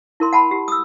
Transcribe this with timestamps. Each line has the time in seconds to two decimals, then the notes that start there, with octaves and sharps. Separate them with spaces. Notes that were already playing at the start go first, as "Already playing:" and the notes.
0.20 E4 A#4 C6
0.33 F#5 A5 B5
0.51 G4
0.68 D#6 E6